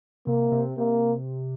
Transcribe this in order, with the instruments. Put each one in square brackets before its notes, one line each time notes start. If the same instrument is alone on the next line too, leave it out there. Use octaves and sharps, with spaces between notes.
[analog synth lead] C3 [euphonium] A#3
[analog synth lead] C3
[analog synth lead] C3 [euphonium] A#3